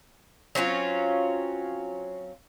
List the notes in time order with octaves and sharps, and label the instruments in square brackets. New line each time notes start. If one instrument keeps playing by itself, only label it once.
[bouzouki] F#3 C4 C#4 F4